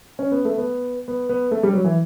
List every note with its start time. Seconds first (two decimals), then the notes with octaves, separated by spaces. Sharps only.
0.19 C#4
0.32 B3
0.45 A3
0.58 B3
1.08 B3
1.29 B3
1.51 A3
1.63 G3
1.73 F#3
1.84 E3